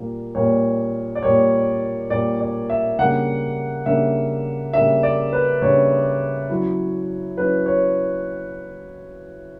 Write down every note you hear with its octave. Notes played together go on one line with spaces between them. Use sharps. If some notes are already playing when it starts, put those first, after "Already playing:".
Already playing: A#2 G3 A#3
A#2 G3 A#3 C#5
D5
A#2 G3 A#3 C#5
A#2 G3 A#3 D5
D5
E5
C#3 G3 A#3 D4 F#5
C#3 G3 A#3 D4 E5
C#3 G3 A#3 D4 E5
D5
B4
C#3 G3 A#3 D4 C#5
F#3 C#4 E4
F#3 C#4 E4 B4
C#5